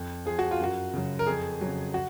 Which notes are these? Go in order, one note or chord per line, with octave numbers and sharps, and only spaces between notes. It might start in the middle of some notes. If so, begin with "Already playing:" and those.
Already playing: F2
F3 G#4
F#4
F4
F#2 F#4
C#3 F#3
A#4
F2 G#4
C#3 F#3
F#4